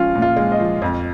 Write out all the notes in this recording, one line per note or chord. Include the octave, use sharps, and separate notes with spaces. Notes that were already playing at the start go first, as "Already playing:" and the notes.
Already playing: F3 G#3 C#4 F4
A#2
F4
G#3
D#5
F3
F2